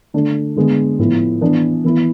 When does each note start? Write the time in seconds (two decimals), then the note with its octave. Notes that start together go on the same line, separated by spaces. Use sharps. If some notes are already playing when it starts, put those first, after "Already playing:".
0.14 D3 A3 D4
0.56 D3 G#3 B3
0.99 A2 F3 B3 E4
1.41 E3 B3 D4
1.85 E3 B3 E4